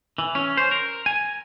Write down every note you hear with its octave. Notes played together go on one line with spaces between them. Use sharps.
E3
C#4
C5
A#4
G#5